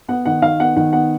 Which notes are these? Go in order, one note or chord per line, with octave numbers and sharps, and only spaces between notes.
B3 F#5
D#3 F#5
D#3 F5
B3 F#5
D#3 F#5
B3 F#5